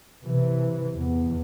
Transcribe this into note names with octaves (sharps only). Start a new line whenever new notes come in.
C3 E3
E2